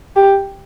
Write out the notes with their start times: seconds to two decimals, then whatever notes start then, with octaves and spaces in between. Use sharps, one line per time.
0.16 G4